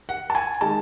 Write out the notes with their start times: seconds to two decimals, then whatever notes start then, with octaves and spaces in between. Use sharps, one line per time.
0.09 F#5
0.30 A5
0.35 G#5
0.61 D#3 G#3 A5